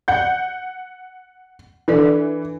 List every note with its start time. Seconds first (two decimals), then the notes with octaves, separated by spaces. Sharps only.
0.08 F#5 G6
1.88 E3 D4 A4 D5